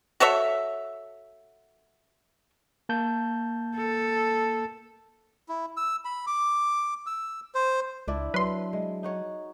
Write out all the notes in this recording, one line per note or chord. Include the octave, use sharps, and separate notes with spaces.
F#4 A4 C#5 E5
A#3 A5 G6
A4
E4
E6
B5
D6
E6
C5
C#2 D4 E4 D5
F#3 B4 C6
G#3
D#4 F#4 C#5